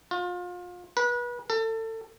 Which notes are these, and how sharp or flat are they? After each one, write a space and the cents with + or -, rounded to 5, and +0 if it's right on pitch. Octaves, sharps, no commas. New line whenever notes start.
F4 +30
B4 -30
A4 +30